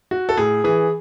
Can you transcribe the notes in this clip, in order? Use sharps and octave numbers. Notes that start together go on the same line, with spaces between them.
F#4
A4
A2 G#4
E3 G#4